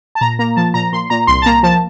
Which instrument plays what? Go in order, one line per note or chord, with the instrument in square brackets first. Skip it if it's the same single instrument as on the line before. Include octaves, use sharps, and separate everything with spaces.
[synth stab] A5
A#2 A#5
A#3 A#5
F3 A5
A#2 A#5
A#2 C6
A#2 A#5
C2 C6
A5
A#3 A#5
F3 A5